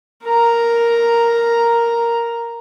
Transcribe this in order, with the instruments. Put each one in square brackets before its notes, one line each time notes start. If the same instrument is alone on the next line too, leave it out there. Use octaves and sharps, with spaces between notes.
[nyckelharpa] A#4 A#5